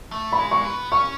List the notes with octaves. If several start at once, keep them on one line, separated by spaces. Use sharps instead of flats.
A3
B5
G#3
C#6
B3
C#4 C#6